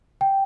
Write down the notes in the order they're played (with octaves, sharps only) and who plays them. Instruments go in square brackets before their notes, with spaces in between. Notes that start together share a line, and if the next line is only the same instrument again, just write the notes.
[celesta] G5